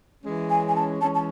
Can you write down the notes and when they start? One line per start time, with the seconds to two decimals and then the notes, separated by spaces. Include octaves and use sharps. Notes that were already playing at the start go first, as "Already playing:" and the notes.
0.24 E3 G#3 C#4
0.50 G#5
0.68 G#5
0.76 A5
1.01 E3 G#3 C#4 A5
1.15 A5